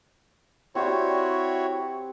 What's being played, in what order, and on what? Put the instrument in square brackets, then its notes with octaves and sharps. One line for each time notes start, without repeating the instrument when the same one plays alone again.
[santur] C4 G4 D5 [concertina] E4 F#4 C#5